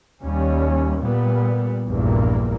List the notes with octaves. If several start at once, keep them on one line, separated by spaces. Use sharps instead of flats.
D#2 G3 C#4
A#2 G3 B3
A#1 E2 G2 A#3